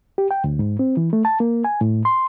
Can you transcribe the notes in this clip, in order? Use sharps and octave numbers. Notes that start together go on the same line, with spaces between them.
G4
G5
D2
G#2
C4
E3
A3
A5
A#3
G#5
A2
C6